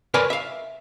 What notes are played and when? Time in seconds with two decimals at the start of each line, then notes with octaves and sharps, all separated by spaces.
0.14 A#4 B4 C#5 D5 G#5 C6
0.30 E5 F5